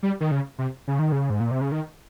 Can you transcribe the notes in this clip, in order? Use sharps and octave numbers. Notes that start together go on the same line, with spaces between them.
G3
D#3
C#3
C3
C#3
D#3
C#3
G#2
A#2
C3
C#3
D#3